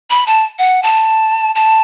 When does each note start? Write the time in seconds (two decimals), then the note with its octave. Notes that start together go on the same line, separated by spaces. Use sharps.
0.10 B5
0.27 A5
0.59 F#5
0.83 A5
1.55 A5